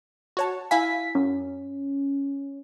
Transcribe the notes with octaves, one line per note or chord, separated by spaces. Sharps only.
F#4 C#5 A5
E4 F5 G#5 B6
F#2 C#4